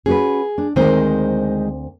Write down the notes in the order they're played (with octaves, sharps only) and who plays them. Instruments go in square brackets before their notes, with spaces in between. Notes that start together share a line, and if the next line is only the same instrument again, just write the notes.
[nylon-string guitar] C#4 F#4 B4 [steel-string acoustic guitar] G#4
[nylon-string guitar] D4
[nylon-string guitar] D2 C4 A#4 [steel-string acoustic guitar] D#3 G#3 C5